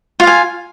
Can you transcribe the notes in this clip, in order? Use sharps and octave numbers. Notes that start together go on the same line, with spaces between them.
F4 F5 G#5